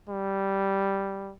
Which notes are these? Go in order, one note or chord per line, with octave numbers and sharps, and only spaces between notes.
G3